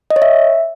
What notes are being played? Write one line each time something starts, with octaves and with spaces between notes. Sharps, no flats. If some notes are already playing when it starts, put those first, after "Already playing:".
D#5
C#5
E5